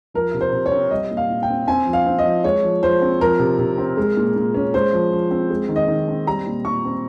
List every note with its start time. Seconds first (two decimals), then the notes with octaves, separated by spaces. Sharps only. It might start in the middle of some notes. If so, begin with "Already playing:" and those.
0.14 F3 A#4
0.34 C3
0.41 C5
0.53 C3
0.66 C#5
0.71 C4
0.91 G3 D#5
1.11 A#2
1.17 F5
1.30 A#2
1.43 G5
1.49 C4
1.67 C4 G#5
1.86 F3
1.93 F5
2.06 C4
2.19 D#5
2.25 F3
2.44 G#3 C#5
2.63 F3
2.83 F3 C5
3.02 C4
3.20 F3 A#4
3.39 C3
3.59 C3
3.78 C4
3.97 G#3
4.17 A#2
4.36 A#2
4.54 C#4
4.74 G#3 C5
4.93 F3
5.12 F3
5.31 C4
5.50 G#3
5.69 D#3
5.76 D#5
5.88 D#3
6.08 C4
6.27 G3 A#5
6.47 A#2
6.65 A#2 C#6
6.85 C4